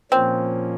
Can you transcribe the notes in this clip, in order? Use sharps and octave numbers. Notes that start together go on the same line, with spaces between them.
A#2 F3 A#3 C4 C#4